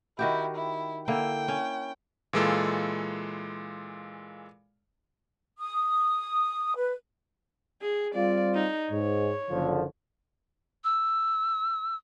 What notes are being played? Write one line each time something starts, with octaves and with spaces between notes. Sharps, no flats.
D#3 E4 F#4 G4
E4
D3 A#3 E4 G5
C#4
A#2 E3 G#3 F4 A4
D#6
B4
G#4
G3 C4 F4 D5
D#4
G#2 C#5
F#1 D3 F3
E6